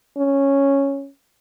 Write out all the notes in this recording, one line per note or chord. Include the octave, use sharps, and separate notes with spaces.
C#4